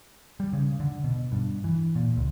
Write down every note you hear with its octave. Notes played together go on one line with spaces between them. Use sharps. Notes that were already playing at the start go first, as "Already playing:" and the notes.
G3
C#3
D3
B2
G2
E3
A#2
C#2